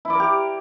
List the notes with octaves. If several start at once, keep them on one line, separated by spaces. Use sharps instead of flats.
E4 G4 A#4 D5